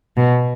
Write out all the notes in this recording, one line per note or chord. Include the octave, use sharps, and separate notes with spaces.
B2